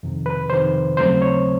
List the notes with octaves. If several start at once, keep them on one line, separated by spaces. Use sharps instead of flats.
F2 C3 D#3
B4
F2 C3 D#3 C5
D#2 C#3 F#3 A3 C4 C5
C#5